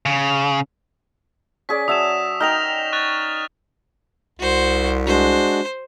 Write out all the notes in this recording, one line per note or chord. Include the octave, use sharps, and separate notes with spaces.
C#3
C#4 G#4 D5 B6
F#3 E5 A5 D#6 E7
D#4 A#4 G5 F6 A#6 F7
C#6 F#6 A6
C2 F#4 C5
G#3 D4 F#4 C5